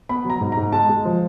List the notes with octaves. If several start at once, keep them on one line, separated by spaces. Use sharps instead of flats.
B3 B5
F#3 A#5
G#2
A#5
G#2
G#3 A5
G#3
F3